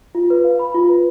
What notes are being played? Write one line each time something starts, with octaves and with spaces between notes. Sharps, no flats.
F4
B4
F5
B5
F4
B4